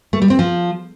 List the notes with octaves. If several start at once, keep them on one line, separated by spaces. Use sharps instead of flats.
A3
G3
C4
F3